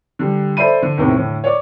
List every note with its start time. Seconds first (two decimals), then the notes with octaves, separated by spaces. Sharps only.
0.19 D3 G3
0.57 A4 C5 D5 E5 B5 D#7
0.82 D3
0.97 E2 A2 C3 D#3 E3
1.16 A2 D3
1.44 C#5 D5 D6